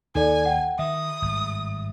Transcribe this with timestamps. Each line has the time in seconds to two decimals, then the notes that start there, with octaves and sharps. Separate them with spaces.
0.15 D#2 D#4 A4 D5 G#5
0.45 F#5 G5
0.79 D#3 E5 D#6
1.22 G#1 G2